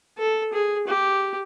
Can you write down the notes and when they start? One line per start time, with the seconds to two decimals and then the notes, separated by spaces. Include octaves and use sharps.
0.18 A4
0.53 G#4
0.87 G4